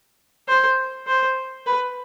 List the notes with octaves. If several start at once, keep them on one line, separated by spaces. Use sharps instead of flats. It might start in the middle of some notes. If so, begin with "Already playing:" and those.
C5
C5
B4